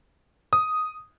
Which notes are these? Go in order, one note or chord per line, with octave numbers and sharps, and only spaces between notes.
D#6